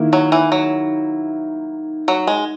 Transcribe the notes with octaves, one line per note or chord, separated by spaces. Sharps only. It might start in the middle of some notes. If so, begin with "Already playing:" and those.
Already playing: D#3 A#3 E4
F#3
E3
F#3
F#3
G#3